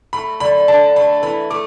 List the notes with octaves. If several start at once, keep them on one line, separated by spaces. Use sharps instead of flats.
A3 B5
D3 B5
D3 A5
A3 B5
E3 B5
A3 D6